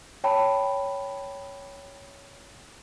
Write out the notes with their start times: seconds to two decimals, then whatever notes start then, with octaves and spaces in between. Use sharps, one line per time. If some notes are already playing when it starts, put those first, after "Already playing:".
0.24 C#5 G5 A5 B5